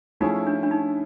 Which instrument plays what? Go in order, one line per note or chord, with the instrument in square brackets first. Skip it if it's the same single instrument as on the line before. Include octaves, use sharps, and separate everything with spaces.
[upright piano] F3 A3 C#4 E4 G#4 [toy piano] D#4
[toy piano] D4
D4
D#4